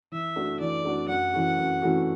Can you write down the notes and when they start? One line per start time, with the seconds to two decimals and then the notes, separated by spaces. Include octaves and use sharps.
0.12 E3 E5
0.36 A3 D4 F#4
0.60 E3 D5
0.85 A3 D4 F#4
1.09 F#2 F#5
1.34 E3 A3 C#4 F#4
1.58 F#2
1.82 E3 A3 C#4 F#4